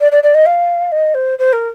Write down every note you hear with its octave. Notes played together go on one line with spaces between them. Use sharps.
D5
D5
D5
D#5
F5
D#5
C5
C5
A#4